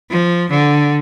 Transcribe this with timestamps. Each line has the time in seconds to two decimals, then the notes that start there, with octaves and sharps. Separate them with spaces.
0.10 F3
0.50 D3